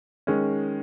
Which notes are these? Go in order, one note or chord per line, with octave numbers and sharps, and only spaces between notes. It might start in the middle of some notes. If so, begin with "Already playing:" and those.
D#3 G#3 C#4